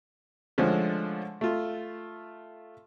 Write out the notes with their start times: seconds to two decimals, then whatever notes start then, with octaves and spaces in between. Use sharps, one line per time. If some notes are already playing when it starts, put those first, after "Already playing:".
0.58 D3 F3 G#3 A3 C#4
1.41 A3 F4